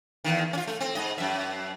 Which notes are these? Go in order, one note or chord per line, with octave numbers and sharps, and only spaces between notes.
E2 G2 D#3
C#4 F4
A3
C4
G#2 D#5
F#2 E5